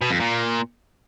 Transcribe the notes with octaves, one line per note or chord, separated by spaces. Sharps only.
B2
F2
A#2